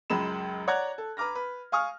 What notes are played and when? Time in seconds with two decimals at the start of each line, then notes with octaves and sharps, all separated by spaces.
0.10 C#2 F#2 G#3 B5 E7
0.68 C#5 D5 F#5 A#5 F#6 G#6
0.98 A4
1.17 B4 A#5 D6 F6 A#6
1.35 B4
1.72 F5 G#5 C#6 D#6 F6